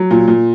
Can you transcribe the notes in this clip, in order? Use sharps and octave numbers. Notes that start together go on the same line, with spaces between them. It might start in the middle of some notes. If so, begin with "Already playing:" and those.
Already playing: F#3
A#2
A#2